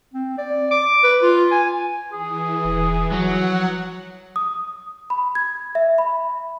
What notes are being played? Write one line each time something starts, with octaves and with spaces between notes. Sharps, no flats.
C4
D5
D6
B4
F4
G#5
E3 G#4
E1
F3 F#3 F#5
D#6
B5
G#6
E5
B5